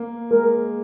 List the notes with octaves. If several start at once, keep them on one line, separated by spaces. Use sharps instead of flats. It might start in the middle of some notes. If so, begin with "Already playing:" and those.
Already playing: A#3
G#3 A#4